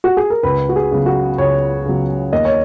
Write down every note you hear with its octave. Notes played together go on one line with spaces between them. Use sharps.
F#4
G#4
A#4
C#2 B4
F#4
G#4
C#3 F#3
F#4
C#2 C#5
C#3 F#3
D#2 D#5
C#5